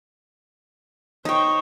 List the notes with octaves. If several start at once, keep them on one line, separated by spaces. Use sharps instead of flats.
D#4 C5 C#5 G5